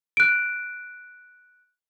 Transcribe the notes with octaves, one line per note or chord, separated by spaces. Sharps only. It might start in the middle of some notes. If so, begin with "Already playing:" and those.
F#6 D7